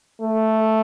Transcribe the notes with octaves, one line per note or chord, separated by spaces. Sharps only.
A3